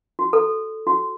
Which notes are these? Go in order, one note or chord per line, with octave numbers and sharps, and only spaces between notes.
F#4
A4
F#4